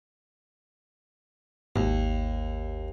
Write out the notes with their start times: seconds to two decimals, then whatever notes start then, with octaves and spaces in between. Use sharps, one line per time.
1.76 G#1 D#2